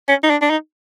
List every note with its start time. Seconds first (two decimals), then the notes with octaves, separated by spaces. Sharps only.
0.09 C#4
0.23 D#4
0.30 D4
0.42 D4
0.50 D#4